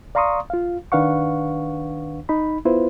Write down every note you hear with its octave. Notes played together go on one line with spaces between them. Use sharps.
D5 F5 A#5 C6 C#6 D#6
F4 F5
D#3 D4 B4 F5 F#5 C#6
D#4 B5
B3 E4 F4 B4 C5